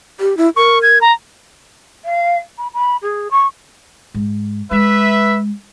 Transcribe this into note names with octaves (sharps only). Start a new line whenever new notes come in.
G4
E4
A#4 C#6
G#6
A#5
F5
B5
B5
G#4
C#6
G#2
G#3 B4 E5